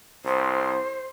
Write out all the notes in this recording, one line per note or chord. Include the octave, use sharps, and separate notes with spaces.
C2 C5